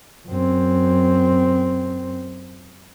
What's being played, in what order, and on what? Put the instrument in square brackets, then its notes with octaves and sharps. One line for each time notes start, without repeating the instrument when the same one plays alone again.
[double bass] F#2 C4